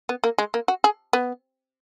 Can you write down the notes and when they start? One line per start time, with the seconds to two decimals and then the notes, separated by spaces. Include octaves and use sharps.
0.09 B3
0.24 A#3
0.38 G#3
0.54 A#3
0.68 F#4
0.84 G#4
1.13 B3